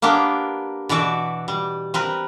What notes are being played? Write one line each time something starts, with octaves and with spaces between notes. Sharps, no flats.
A#3 B3 D4 G4 A#4
B2 E3 F#4 D5 E5
G3
C4 A#4 B4